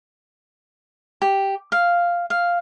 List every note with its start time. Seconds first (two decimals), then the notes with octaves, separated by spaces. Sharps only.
1.22 G4
1.72 F5
2.30 F5